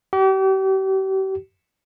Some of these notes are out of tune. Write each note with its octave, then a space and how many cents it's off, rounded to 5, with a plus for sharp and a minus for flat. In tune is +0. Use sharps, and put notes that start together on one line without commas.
G4 -40